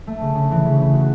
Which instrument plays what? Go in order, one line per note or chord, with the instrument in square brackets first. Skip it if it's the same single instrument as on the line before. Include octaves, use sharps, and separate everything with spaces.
[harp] A3
C#3
C#3
E3
C#3
C#3
F#4